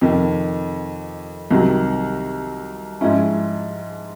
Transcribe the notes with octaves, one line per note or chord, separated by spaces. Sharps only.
F2 C3 D#3
C2 C3 D#3 F#3
G#2 F3 G#3 C#4 E4